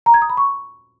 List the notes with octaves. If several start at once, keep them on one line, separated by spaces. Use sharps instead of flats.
A#5
G#6
D#6
B5
C#6